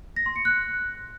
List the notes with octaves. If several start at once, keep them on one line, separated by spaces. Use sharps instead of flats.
A#6
C6
C#7
F#6